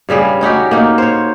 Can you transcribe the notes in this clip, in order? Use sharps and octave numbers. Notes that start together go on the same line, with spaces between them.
G2 C#3 G3 G#4
C#4 D#4 F#4 G4
A#3 D#4
C5 C#5